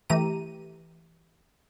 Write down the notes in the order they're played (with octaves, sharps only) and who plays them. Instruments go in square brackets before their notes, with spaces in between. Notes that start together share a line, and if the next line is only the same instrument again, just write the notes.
[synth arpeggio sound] E3 A3 G4 A#5 D#7